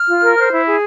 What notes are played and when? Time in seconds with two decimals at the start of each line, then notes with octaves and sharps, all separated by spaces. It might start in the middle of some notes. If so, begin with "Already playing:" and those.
Already playing: F6
0.08 F4
0.23 A#4
0.38 C5
0.52 E4
0.66 G#4